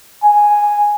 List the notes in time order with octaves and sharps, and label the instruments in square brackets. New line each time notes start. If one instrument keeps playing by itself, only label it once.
[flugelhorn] G#5